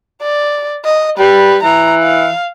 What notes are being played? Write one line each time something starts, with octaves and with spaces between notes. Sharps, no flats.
D5
D#5
G3 B4
E3 A#5
F5